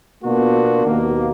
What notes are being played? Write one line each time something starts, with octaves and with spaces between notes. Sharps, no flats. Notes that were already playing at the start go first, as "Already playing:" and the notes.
B2 A#3 B3 D4 F4 F#4
D#2 B2 D#3 A#3